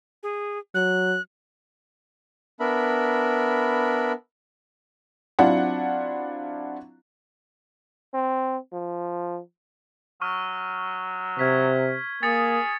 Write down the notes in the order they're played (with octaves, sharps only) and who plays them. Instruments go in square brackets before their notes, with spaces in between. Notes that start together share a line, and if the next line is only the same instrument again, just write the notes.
[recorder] G#4
[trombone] F#3 [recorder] F#6
[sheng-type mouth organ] B3 D4 A#4 E5 B5
[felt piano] F#3 C4 D4 E4 F4 F#5
[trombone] C4
F3
[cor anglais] F#3 [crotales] C#6 F6
[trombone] C3 [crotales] F6 G#6 B6
[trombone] A#3 [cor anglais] G#4 [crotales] D#6 A6 C#7